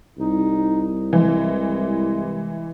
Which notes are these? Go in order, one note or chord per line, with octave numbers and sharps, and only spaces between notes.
C2 D#4
E3 G#3